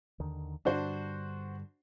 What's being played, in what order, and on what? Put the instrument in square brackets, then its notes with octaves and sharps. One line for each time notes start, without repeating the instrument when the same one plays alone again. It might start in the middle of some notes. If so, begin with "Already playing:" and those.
[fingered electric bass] D#2 D3 D#3
[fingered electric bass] G2 D3 G3 [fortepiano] D4 F#4 C5